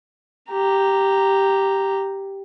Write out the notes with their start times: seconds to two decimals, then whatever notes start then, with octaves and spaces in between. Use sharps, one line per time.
0.51 G4 A#5